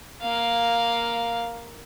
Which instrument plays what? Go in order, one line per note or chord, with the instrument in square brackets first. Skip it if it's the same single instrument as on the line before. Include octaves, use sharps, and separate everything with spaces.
[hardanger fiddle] A#3 F5